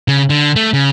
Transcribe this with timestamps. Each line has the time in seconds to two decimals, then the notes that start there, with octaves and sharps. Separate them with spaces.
0.08 C#3
0.30 D3
0.56 A3
0.73 C#3